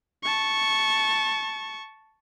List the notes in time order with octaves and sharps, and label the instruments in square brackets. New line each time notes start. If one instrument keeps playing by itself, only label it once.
[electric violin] A5 C#6